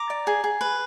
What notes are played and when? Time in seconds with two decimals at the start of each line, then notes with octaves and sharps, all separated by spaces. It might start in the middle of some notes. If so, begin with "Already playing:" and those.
Already playing: A#5 D6
0.10 D5
0.27 G#4
0.44 G#4
0.61 B4